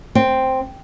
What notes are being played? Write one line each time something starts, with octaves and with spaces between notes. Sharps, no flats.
C4